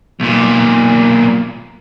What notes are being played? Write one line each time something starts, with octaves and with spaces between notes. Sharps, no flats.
B1 A#2